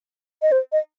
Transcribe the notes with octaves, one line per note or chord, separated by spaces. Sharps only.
D#5
C5
D#5